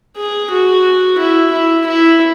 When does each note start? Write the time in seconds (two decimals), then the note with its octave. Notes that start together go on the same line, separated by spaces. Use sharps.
0.17 G#4
0.51 F#4
1.18 E4
1.52 E4
1.86 E4